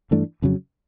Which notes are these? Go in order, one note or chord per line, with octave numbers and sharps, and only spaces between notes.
G2 E3 A3 D4
F2 C#3 F#3